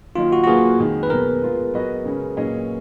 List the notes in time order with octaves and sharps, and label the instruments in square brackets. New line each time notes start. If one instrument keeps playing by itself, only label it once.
[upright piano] D#3 F#3 A#3 D#4 [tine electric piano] F4
[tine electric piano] F#4
F#4
[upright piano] A#2 F#3 A#3 F4 B4 [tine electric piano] G#4
[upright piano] F2 D#3 G#3
[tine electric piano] B4
[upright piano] B2 F#3 B3 [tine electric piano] A#4
[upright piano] G#3 B3 F4
F#3 B3 F#4 B4 D#5
C#3 G#3 C#4
A#2 F#3 C#4 G#4 D#5